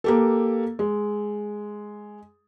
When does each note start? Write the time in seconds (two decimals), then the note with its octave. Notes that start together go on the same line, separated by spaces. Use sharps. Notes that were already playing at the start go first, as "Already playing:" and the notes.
0.04 A#3 G4 A4
0.79 G#3